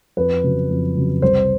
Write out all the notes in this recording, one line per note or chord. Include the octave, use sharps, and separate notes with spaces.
F2 B4
C#3 F#3
F2
C#3 F#3
C2 C5